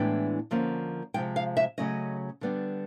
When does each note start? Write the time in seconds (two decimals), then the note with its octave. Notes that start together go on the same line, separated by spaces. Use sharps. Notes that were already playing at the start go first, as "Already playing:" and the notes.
Already playing: A2 E3 G#3 B3 D4 G5
0.51 D3 F3 A#3 C#4
1.14 C3 F3 G#3 G5
1.36 F5
1.57 E5
1.78 C#3 F#3 A3 C#4 D#5
2.41 D3 G3 B3 D4